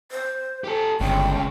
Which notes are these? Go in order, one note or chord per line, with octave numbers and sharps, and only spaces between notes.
C5
G4 A4
G1 C#2 C#3 G5